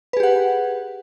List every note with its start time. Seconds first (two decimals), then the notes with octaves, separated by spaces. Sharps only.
0.13 B4
0.17 G#4
0.20 G4
0.23 F#5